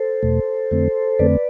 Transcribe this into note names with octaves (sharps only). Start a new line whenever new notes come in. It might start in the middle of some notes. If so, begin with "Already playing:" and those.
Already playing: A4 C5
E2 B2 A3
F2 D3 A3 C4
F2 D3 A3 C4 B4 D5